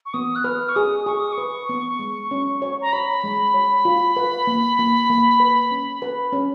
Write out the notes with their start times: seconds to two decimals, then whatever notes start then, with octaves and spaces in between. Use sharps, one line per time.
0.06 C#6
0.14 B3 D#6
0.36 F#6
0.44 B4 F6
0.69 C#6
0.76 G#4 D#6
1.06 G#4 C#6
1.19 D#6
1.32 C#6
1.38 B4
1.69 B3
1.99 G#3
2.31 C#4
2.62 C#5
2.81 A#5
2.93 C#5 B5
3.24 G#3
3.54 C#5
3.85 F4
4.16 B4
4.47 A#3
4.79 A#3
5.09 A#3
5.40 B4
5.71 C#4
6.02 B4
6.33 C#4